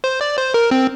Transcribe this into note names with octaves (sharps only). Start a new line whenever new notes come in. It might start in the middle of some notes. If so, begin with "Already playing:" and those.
C5
D5
C5
A#4
C4